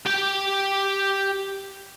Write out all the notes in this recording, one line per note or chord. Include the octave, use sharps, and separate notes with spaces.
G4 G5